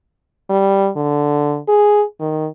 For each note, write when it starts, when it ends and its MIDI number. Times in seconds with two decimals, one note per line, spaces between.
0.49 0.89 55
0.96 1.58 50
1.68 2.03 68
2.20 2.47 51